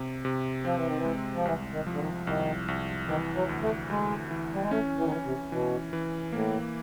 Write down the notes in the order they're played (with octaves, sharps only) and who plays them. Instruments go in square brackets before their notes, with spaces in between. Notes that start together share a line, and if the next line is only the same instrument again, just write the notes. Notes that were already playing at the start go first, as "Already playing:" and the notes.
Already playing: [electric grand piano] C3
C3
[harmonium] F3 [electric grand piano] C4
[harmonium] E3
D#3
E3
[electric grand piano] G#3
[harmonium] F3
[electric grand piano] C2 [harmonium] E3
[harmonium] D#3
[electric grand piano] F3
[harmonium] D3
D#3
[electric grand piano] C2 [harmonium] D#3
[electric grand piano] C2
[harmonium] D#3 [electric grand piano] E3
[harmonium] F#3
[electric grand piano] D2
[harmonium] A3
[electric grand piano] D2 [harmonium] G#3
[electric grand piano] E3
[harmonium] G3
G#3
[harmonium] A3 [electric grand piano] C#4
[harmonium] E3
D#3
[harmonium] E3 [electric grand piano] C#4
[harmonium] C3
[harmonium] B2 [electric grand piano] E3
[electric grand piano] E3
[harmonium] A2 [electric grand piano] A#3